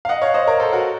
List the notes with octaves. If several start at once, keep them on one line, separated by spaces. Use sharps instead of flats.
F5
D#5 F#5
C#5 F5
C5 D#5
A#4 C#5
A4 C5
F#4 A#4